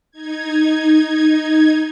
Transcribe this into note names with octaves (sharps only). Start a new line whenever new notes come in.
D#4 G#6